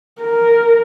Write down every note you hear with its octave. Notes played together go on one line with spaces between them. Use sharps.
A#4